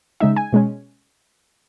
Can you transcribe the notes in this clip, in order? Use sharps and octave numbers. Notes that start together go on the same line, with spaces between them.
C#3 G#3 D#4 E5
G#5
B2 G#3 C#4